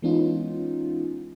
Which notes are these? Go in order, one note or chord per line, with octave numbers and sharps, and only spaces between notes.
E3 G#3 B3 C#4 D#4 F4